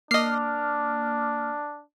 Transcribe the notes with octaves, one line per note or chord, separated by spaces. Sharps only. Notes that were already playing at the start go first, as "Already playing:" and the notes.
A#3 D4 D#5 D6 F6 C7